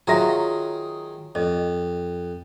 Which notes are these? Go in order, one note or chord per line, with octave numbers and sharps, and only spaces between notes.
D#3 F#3 F4 F#4 G#4 E5 A#5
F2 D#5